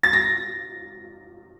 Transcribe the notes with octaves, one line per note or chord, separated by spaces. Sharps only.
A6
A#6